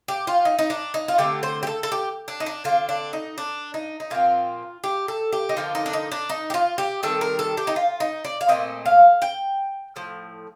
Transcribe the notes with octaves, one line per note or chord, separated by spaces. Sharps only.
G4
F4
D#4
D#4
D4
D#4
F4
D3 A3 C4 G4
C5
G4
A4
A4
G4
D4
D#4
D4
D3 A3 C4 F4
D4
D#4
D4
D#4
D#4
A#2 F3 C4 F4
G4
A4
G4
D#4
D3 F3 A#3 F4
D#4
D4
D#4
D4
D#4
G4
F4
G4
D#3 G3 C4 A4
A#4
A4
G4
D#4
F4
D#4
D5
F5
A#2 A3 C4 D#5
F5
G5
A2 F3